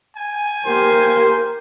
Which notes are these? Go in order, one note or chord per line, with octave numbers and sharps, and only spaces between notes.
G#5
A#3 G4 A#4 C5